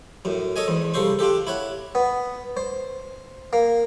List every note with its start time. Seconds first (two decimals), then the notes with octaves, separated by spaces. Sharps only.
0.25 F#2 A2
0.56 A4 C#5 D#5 G#5
0.68 E2 G#2
0.94 C2 C#3 A4 C5 C#6
1.19 D4 F4 G4 A4
1.47 E4 C#5 F#5
1.95 B3
2.57 C5
3.53 A#3